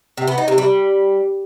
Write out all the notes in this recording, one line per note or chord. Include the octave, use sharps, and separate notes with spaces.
C3
B3
D#4
C3
G3